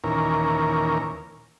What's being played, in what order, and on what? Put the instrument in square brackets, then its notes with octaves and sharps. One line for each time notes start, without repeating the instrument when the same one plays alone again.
[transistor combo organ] D#2 A#2 E3 C#4 A#4